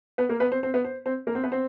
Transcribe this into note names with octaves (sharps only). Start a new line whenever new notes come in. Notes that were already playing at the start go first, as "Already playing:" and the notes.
B3 B4
A#3 A#4
B3 B4
C4 C5
C4 C5
B3 B4
C5
C4 C5
A#3 A#4
C4 C5
B3 B4
C4 C5